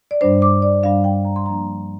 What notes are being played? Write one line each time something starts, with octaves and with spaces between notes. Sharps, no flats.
D5
G2 G3 D4 C5
D6
D5
G2 G3 D4 F5
G5
A#5
C6
G2 F3 A#3 D4 A#5